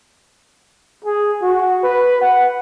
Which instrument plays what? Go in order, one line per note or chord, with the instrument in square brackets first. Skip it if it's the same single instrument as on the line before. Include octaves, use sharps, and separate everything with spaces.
[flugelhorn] G#4
F#4
B4
F#5